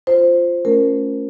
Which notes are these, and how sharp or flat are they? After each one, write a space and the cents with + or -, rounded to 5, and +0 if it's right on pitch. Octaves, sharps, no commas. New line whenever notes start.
F4 -5 C5 +0
A3 +0 C#4 +0 A#4 +0